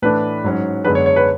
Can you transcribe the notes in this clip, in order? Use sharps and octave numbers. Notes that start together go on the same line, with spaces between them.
A2 E3 A3 D4 B4
G#2 F#3 C#4
F#2 D3 G#3 B3 D4 B4
C#5
C#5
B4